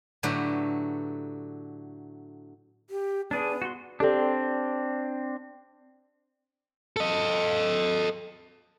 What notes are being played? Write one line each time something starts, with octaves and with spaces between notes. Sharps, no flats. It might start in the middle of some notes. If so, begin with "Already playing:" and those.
A2 D3 F#3 A3 G4 B4
G4
B3 D4 G#4
F#4 C6
C4 D4 G4 A4 D5
A4 D#5